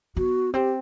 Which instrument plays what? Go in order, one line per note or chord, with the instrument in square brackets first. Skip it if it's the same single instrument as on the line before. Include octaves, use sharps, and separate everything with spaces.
[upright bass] B3 [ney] F#4
[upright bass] C4 [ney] G4